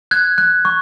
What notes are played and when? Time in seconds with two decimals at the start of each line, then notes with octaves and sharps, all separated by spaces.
0.11 F#6 G#6
0.38 F#6
0.65 C#6